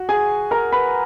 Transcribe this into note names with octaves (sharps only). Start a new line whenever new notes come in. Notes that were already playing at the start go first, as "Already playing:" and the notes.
Already playing: F#4
G#4 G#5
A#4 A#5
B4 B5